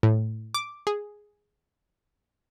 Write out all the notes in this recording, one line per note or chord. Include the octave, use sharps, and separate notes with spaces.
A2
D6
G#4